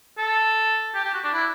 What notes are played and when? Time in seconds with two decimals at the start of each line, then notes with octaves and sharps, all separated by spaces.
0.18 A4
0.94 G4
1.04 G4
1.14 F#4
1.24 D4
1.33 E4